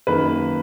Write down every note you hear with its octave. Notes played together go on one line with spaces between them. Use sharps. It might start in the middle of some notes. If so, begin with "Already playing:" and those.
F#2 D#3 A#3 B4